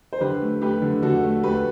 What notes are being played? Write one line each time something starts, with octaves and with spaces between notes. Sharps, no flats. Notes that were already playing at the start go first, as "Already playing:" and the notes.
C5
D3 G4 B4
A3
A3 G4 B4
D3
D3 F#4 A4
A3
A3 G4 B4